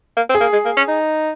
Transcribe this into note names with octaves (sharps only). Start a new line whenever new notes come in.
A#3
C4
G#4
A#3
G#3
A#3
C#4
D#4